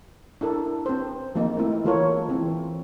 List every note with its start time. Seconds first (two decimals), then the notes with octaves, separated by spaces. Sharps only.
0.41 D4 E4 A4 A#4
0.86 C4 B4 C5
1.35 F3 G#3 A#3 D#4
1.57 A3 C4 E4
1.84 E3 G#3 F4 A4 A#4 C#5
2.29 E3 C4